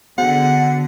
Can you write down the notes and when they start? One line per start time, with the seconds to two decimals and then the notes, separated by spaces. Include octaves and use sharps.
0.18 D3 B3 F#4 G#4 F#5